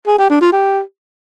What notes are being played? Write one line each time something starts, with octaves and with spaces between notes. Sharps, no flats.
G#4
G4
D4
F4
G4